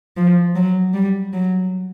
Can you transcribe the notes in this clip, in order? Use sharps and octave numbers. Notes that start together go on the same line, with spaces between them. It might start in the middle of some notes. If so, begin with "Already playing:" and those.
F3
F#3
G3
F#3